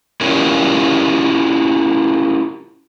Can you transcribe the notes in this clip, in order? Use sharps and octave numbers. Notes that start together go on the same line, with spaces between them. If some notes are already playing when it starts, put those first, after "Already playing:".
C#4 E4 F4 G4 A#4 C#5